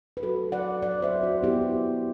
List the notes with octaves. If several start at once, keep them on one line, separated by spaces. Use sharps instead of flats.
B4
F#3 F#4 A4
F#3 D5 F#5
F#3 D5 F#5
C5 E5
F#3
F#4
B3 E4 G4